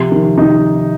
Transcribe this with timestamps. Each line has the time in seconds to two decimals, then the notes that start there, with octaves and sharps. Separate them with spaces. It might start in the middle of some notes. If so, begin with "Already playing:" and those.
Already playing: C3 F3
0.12 D#3
0.38 C3 D#4